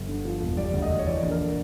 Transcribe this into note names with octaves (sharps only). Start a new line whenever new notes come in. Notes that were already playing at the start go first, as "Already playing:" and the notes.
Already playing: G1
D3
F3
E1
G3 D5
D2
D#5
D2
C#5
E3 D5
A#1
A#4